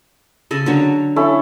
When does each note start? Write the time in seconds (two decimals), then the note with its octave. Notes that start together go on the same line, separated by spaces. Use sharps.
0.51 C#3 A4 G#5
0.66 D3 F#3 C#5
1.16 C#4 E4 A4